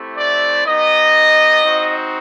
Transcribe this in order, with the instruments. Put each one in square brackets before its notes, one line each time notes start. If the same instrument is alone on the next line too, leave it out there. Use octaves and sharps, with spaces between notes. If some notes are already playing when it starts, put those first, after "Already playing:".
Already playing: [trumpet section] A3 C4 E4 G4
D5
B3 D#4 G4 D#5
C4 D#4 F#4